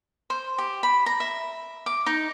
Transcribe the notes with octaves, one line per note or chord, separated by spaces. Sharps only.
C5
G4
B5
A#5
E5
D6
D#4